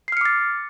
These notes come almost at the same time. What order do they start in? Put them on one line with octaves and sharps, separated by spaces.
C7 F6 C#7 D6 A6